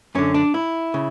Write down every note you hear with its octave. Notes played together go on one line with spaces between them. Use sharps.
F#2 D3 C#4
D4
E4
C#3